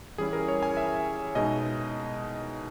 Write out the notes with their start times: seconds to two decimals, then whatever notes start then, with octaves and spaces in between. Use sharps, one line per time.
0.18 E3 G3 C#4 E4 G#4
0.33 A#4
0.48 C#5
0.63 G#5
0.77 E5
1.35 B2 G#3 D#4 D#5